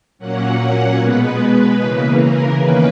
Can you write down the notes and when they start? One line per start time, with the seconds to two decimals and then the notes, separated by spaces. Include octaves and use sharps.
0.18 A#2 F#3 A#3 C#4 F#5
0.59 F#5
0.99 B2 G#3 B3 B4
1.78 C#3 E3 A#3
2.18 A#4
2.58 E2 D#3 A#3 C#4 B4